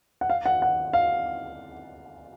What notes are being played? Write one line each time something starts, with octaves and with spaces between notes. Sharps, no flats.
F#5
F5
F#5
F#5
F5